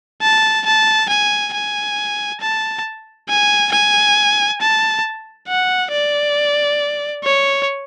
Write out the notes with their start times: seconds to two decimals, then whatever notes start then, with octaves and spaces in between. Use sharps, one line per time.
0.22 A5
0.66 A5
1.09 G#5
1.54 G#5
2.41 A5
3.29 G#5
3.72 G#5
4.61 A5
5.48 F#5
5.92 D5
7.24 C#5